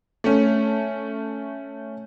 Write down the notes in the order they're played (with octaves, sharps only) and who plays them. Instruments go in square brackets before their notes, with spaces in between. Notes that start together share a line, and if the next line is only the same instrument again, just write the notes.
[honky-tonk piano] A3 C#4